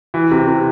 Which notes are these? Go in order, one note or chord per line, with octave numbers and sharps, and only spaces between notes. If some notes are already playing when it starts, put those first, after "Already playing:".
E3
C3
C3